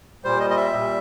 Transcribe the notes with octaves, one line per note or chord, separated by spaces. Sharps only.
A#2 G3 C5
D#5
D#5
E5
A#2 G3